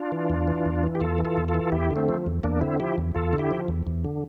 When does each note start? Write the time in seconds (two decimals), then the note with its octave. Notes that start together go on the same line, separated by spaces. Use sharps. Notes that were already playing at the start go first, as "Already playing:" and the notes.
Already playing: D4 F4
0.12 E3
0.30 E2
0.47 E3
0.65 E2
0.83 E3
0.95 G4
1.00 E2 F4 A4
1.18 E3
1.25 F4 A4
1.37 E2
1.48 F4 A4
1.54 E3
1.72 E2 E4 G4
1.91 D3
1.96 A3 C4
2.09 F3
2.26 E2
2.43 E2 A#3 D4
2.61 D3 C4 E4
2.80 F3 E4 G4
2.98 E2
3.15 E2 F4 A4
3.33 D3
3.38 E4 G4
3.51 F3
3.68 E2
3.87 E2
4.05 D3